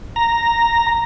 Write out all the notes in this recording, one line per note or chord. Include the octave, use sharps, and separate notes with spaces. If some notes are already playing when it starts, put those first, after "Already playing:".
A#5